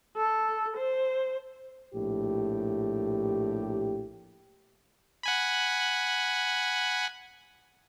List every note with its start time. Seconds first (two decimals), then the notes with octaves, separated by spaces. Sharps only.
0.17 A4
0.77 C5
1.94 A#1 A2 G4
5.23 F#5 G#5 B5